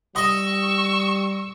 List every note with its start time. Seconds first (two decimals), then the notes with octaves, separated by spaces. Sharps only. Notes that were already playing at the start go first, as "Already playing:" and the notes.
0.16 G3 D#5 C#6 E6